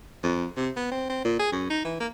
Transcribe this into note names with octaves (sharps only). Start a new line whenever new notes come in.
F2
C3
B3
C4
C4
A#2
G#4
F#2
D#4
E3
A#3